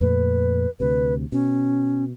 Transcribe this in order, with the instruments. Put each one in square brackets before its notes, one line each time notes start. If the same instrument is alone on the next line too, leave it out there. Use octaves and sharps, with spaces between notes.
[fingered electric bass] F2 A#2 A3 [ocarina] B4
[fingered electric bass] D2 C3 [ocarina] B4
[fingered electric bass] B2 [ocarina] C#4